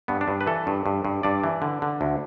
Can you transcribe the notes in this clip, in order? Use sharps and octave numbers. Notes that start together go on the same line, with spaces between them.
G2 B3
D4
G2
B4
E3 A4
G2
G2
G2
G2 D5
E3
D3
D3
D2